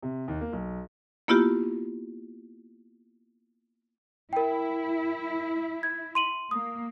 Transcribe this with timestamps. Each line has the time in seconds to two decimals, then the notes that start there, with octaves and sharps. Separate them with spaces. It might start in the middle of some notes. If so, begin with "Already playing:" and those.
0.03 C3
0.28 D#2
0.41 A#3
0.53 B1
1.28 A#3 B3 E4 F4 G4
4.33 E4 A#4 G5
5.83 G#6
6.15 C6 D#7 F#7
6.51 A#3 D#6